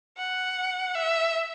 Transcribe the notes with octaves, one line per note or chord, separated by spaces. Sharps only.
F#5
E5